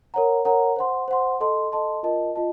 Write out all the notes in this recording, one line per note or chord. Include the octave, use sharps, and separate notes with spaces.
A#4 C#5 F#5 A#5
A#4 C#5 F#5 A#5
C5 F#5 C6
C5 F#5 C6
A4 D#5 A5 C6
A4 D#5 A5 C6
F4 A#4 D#5 A5
F4 D#5 A5